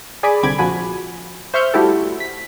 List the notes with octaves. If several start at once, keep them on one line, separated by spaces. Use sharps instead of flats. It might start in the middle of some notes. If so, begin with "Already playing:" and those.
G#4 D5 G#5 B5 D6
C2 D3 C4 B5 D6 G#6
A#1 F3 F#4 G#5 B5
C5 E5 C#6 F6 G6
G3 A3 E4 F#4 G4 A4
B6